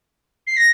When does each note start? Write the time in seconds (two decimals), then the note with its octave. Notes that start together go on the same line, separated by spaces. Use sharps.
0.47 C7
0.57 A#6